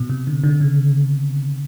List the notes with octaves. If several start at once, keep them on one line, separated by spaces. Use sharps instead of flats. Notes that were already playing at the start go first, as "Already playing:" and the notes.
Already playing: B2
C3
D3
D3
C#3